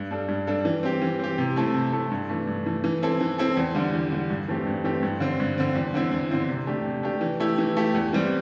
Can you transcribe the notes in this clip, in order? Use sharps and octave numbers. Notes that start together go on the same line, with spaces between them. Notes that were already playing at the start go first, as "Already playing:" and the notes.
Already playing: G2
G3 D4 A4
G2
G3 D4 A4
E3
C4 G4
E3
C4 G4
C3
A3 C4 E4 A4
C3
A3 C4 E4 A4
G2
E3 A3
G2
E3 A3
E3
C4 E4 A4
E3
C4 E4 A4
E2
D3 G3
E2
D3 G3
G2
E3 A3 C4 G4
G2
E3 A3 C4 G4
G2
D3 C4
G2
D3 C4
E2
D3 C4 E4
E2
D3 C4 E4
C3
A3 D4 G4
C3
A3 D4 G4
E3
A3 E4 G4
E3
A3 E4 G4
E2
E3 G3 C4